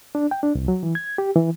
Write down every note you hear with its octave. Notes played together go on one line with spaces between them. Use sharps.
D4
G5
D4
C2
F#3
E3
G#6
G4
E3